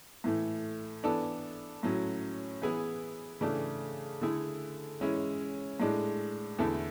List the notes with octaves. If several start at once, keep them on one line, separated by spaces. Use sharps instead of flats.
A2 E3 A3
E3 B3 D4 A4
A2 F#3 C#4
E3 B3 E4 G#4
C#3 E3 A3 D4
D3 A3 E4 G#4
E3 G#3 C#4 E4
A2 G#3 D4
E2 D3 A3 E4 A4